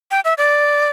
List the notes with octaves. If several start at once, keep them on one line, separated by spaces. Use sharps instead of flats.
G5
E5
D5